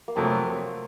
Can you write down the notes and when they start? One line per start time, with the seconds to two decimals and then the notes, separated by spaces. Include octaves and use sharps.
0.08 A#3
0.15 F2 C3 F#3 A3 C4